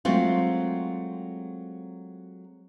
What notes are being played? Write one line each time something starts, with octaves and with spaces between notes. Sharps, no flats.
F#3 G#3 A3 C4 F4